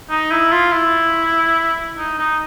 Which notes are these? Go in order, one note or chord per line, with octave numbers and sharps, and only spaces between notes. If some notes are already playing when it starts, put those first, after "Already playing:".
D#4
E4
F4
E4
D#4
D#4